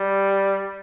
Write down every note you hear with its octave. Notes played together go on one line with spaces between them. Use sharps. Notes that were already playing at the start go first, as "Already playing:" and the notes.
Already playing: G3